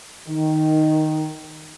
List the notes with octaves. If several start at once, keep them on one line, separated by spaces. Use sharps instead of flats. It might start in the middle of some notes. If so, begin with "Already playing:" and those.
D#3